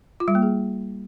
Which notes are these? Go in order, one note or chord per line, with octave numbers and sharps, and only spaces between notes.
F4
G3
A#3
G#4